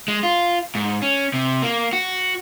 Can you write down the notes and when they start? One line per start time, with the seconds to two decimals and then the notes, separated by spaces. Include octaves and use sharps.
0.08 G#3
0.23 F4
0.75 G#2
1.02 C#4
1.34 C3
1.62 A#3
1.93 F#4